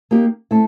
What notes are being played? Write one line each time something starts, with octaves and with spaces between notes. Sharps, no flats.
A#3 D#4 G4
A3 C4 E4